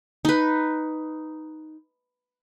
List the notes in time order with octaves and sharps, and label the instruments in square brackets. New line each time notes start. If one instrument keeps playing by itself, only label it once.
[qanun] D#4 B4